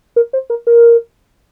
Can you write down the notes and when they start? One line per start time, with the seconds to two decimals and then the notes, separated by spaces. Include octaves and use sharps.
0.16 A#4
0.33 C5
0.50 A#4
0.67 A#4